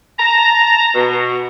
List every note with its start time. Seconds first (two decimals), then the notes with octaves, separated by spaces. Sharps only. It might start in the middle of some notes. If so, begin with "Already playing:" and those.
0.19 A5 A#5
0.95 B2